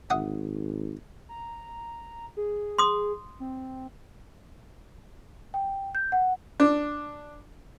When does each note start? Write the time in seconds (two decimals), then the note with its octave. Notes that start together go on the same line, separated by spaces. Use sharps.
0.10 G#1 E5 F#5 D#6
1.29 A#5
2.37 G#4
2.79 C6 D#6
3.40 C4
5.54 G5
5.95 G6
6.12 F#5
6.60 D4